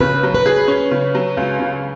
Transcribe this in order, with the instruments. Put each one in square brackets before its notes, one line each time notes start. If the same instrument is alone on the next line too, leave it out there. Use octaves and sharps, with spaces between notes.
[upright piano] C#3 [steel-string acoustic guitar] B4
[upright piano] F#3
[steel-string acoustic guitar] B4
[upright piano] G#4
C#4
C#3
F#3
C#2
C#3